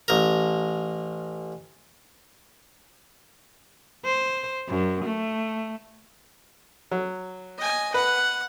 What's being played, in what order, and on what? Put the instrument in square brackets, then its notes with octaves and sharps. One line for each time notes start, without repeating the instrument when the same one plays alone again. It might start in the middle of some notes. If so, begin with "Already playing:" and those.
[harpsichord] A1 A#4
[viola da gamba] C5
F#2
A3
[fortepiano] F#3
[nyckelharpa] D#5 G#5
[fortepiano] B4 [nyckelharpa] F#5